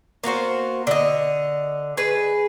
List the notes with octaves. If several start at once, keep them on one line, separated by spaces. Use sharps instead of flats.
A#3 B3 F#4 C5
D3 D#5
G#4 B4